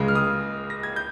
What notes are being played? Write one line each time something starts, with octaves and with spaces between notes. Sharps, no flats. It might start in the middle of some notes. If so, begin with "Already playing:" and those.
Already playing: C#2 C#3 G#3
F6
D#6
A#6
G#6
G6